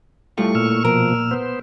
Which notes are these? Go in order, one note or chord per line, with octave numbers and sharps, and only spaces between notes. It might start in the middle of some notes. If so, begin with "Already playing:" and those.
A2 G3 A3 F4 C#6
A#2 E6 F6
B2 F3 A#4
B3 C5